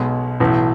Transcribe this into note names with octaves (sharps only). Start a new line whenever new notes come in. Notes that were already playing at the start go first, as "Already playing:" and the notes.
Already playing: B1 B2 G#3
B1 A2 E3